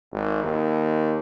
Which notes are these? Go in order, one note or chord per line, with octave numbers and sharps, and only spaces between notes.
G#1
D#2